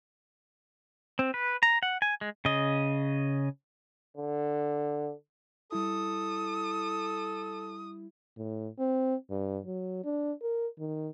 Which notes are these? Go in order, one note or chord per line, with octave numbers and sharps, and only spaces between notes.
C4
B4
A#5
F#5
G#5
G#3
C#3 D#5
D3
G3 E4 A4 D#6
A2
C4
G2
F#3
D4
A#4
D#3